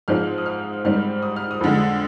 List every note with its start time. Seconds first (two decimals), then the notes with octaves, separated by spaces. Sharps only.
0.08 G#2 F3 G#3 C4 F6
0.38 D#6
0.46 F6
0.84 G#2 G3 C4 F6
1.22 D#6
1.36 F6
1.51 D#6
1.61 F2 D3 G#3